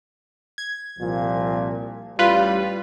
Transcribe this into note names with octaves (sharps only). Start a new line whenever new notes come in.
G#6
C2 A#2 F3
A1 G3 F4 B4